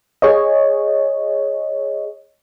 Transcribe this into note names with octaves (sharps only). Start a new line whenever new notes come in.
G#4 C#5 D#5